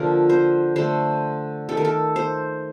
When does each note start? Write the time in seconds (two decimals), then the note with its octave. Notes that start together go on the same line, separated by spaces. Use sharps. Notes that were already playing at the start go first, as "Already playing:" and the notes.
Already playing: D3 F3 A#3 A#4
0.30 C5
0.76 D3 A3 C5
1.69 D#3 A3 A4
1.77 A#4
1.85 A4
2.16 C5